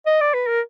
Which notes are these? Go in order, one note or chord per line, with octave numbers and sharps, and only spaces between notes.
D#5
D5
B4
A#4